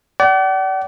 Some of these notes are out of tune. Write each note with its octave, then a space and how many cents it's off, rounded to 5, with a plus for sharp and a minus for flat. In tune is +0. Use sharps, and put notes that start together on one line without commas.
D5 -20 F#5 +45